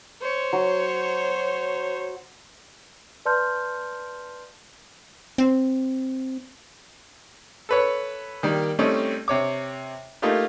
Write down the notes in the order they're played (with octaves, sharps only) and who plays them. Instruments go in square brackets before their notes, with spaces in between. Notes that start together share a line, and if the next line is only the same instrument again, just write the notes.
[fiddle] C5 C#5
[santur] F#3
[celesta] B4 D5 A5 C6 F6 G6
[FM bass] C4
[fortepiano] A4 B4 C#5
D#3 G3 A#3
G3 A3 C4 C#4 D#4
C3 C#5 D6
A3 A#3 D#4 F4 G4